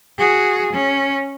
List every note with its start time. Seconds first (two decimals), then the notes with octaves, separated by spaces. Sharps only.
0.18 F#4 G#4
0.73 C#4